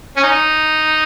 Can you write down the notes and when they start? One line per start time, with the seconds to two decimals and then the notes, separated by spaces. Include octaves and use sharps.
0.16 C#4
0.23 D#4